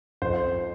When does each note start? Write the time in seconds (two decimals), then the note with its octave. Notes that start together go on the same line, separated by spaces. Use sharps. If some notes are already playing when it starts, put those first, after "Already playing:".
0.22 F2 C5